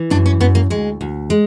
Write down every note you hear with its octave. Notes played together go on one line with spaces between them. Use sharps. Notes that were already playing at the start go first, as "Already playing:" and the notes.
Already playing: E3
F#2 D4
C#4
F#2 B3
A#3
D2 G#3
D2
G#3